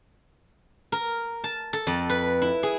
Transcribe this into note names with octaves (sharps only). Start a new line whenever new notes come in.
A#4
A5
A4
F2
B4
E4
G#4